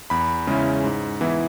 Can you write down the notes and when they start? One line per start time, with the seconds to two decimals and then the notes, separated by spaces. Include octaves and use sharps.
0.10 E2 B5
0.47 C#3 G#3 C#4 E4
0.84 G#2
1.21 E3 B3 E4